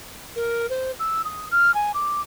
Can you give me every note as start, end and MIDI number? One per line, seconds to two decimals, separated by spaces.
0.36 0.69 70
0.69 0.91 72
0.99 1.22 88
1.24 1.46 87
1.51 1.74 89
1.74 1.92 80
1.94 2.21 86